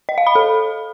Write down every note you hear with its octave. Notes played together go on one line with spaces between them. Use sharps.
D#5
F5
B5
A4